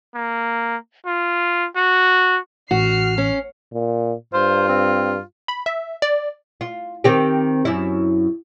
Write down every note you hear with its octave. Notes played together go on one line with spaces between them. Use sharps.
A#3
F4
F#4
A1 F#4 F6 C7
C#4
A#2
G2 F4 C5
C4
B5
E5
D5
F4
D#3 C4 G4
F#2 E4